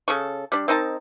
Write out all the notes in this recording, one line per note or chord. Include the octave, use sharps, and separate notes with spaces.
C#3 A4 C#6
G3 D4
C4 D#4 A#4 A5